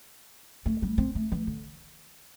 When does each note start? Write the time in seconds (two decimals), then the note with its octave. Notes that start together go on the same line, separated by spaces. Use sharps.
0.66 A3
0.82 G3
0.98 C4
1.15 A3
1.32 E3
1.47 D3